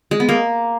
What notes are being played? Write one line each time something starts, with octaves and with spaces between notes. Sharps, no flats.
G#3
B3
A#3